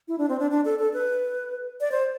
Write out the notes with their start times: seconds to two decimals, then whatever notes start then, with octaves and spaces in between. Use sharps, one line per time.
0.08 E4
0.18 D4
0.29 C4
0.39 D4
0.51 D4
0.65 A4
0.79 A4
0.93 B4
1.81 D5
1.92 C5